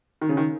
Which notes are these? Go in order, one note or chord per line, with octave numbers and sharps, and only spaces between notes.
D#3
C#3
D#3